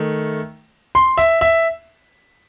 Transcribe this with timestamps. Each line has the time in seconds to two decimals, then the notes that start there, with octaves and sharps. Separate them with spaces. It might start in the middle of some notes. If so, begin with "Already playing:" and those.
Already playing: D#3 A3
0.95 C6
1.18 E5
1.41 E5